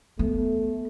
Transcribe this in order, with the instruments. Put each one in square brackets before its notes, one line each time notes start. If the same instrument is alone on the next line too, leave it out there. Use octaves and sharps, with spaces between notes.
[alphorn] A3 [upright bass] B3